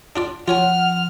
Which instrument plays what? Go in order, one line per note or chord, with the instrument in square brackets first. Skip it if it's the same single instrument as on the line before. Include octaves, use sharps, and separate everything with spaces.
[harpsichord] D4 F4 D5
[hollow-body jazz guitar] F3 [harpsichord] F4 C#5 G#5 [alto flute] F#5 [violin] F6